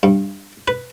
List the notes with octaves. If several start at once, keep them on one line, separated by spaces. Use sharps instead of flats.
G2
B4